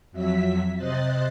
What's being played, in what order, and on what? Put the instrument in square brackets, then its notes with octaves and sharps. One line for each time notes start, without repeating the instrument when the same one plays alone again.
[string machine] F2 F#3 E5 B6
C3 C5 D#5 C6 F#6 A6